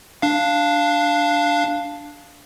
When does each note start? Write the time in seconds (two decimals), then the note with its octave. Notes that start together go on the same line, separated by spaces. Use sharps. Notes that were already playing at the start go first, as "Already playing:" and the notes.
0.22 D4 F5